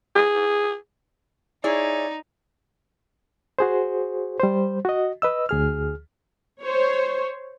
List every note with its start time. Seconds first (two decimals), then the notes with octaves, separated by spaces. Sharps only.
0.16 G#4
1.64 D#4 E4 G#4 C#5 D5
3.59 F#4 G#4 C5
4.40 G3 C5
4.85 F#4 D#5
5.22 B4 D#5 E6
5.49 D2 G#4 F6
6.63 C5 C#5